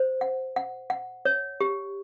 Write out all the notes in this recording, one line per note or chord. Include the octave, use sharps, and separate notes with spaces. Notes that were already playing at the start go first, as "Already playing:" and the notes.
Already playing: C5
F#5
F#5
F#5
C#5
G4